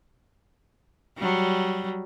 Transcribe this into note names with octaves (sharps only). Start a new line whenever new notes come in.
F#3 G3